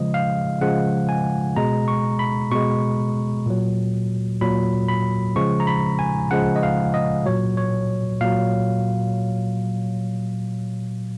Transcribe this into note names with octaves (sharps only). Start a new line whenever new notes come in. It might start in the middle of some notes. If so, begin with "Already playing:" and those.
Already playing: C#3 F3 G#3 D#5
F5
C#3 F3 G#3 F#5
G#5
B2 G#3 A#5
C#6
B5
B2 G#3 C#6
A#2 F#3
A#2 F#3 B5
B5
C#3 F3 G#3 C#6
A#5
B5
G#5
C#3 F3 G#3 F#5
D#5
F5
D#5
A#2 F#3 C#5
C#5
A#2 F#3 F5